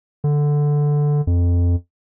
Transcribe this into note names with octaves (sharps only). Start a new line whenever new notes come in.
D3
F2